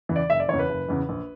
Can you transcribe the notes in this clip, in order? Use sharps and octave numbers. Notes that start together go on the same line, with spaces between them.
E2 C#3 E3
D5
F#1 E5
D5
E2 C#3 E3 C#5
B4
F#1
E2 C#3 E3
A#1